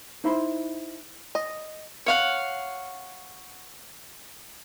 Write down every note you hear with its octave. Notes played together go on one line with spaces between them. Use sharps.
D#4 E4 C5 E5 B5 C6
D#5
C#5 F5 F#5